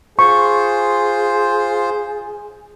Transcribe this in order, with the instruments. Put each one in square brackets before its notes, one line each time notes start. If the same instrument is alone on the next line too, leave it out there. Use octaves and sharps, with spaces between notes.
[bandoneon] F4 C5 [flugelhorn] G#4 [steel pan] C#6